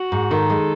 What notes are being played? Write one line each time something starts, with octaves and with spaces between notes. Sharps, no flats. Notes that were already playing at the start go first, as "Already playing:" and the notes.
Already playing: F#4
G#2
D#3 A4
G#3